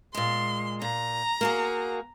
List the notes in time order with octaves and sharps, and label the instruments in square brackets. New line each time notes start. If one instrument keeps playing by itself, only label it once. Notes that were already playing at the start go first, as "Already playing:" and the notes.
[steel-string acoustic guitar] A#2 G#3 [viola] C6
[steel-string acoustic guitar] A#2 [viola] A#5
[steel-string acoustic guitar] A#3 F#4 G#4